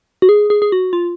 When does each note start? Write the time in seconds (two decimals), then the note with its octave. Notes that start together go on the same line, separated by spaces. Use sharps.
0.22 F#4
0.29 G#4
0.50 G#4
0.62 G#4
0.72 F#4
0.93 F4